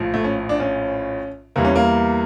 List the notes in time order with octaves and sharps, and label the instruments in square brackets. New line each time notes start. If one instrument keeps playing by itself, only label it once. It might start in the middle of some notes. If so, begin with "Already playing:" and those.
Already playing: [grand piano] A#1 A2 F3
A3
C#4
D4
C#4
E2 E3 G3 A#3
C#4
A#3